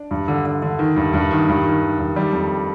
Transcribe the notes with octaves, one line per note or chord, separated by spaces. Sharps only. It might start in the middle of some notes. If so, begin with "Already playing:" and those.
Already playing: D4
G2
D3
D3
D3
D#3
G2
G2
D#3
G2
D#3
D#3
G2
D#3 G3
F2